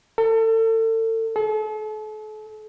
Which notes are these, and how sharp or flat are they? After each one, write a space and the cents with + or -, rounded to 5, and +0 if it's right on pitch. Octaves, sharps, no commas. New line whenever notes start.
A4 +35
A4 -40